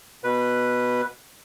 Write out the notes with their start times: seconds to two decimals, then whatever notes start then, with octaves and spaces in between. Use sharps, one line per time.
0.24 B2 B4